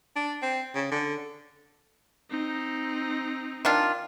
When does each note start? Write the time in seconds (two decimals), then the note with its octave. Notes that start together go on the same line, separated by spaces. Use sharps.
0.16 D4
0.42 C4
0.75 C#3
0.92 D3
2.30 C4 D#4
3.65 D#3 D4 F4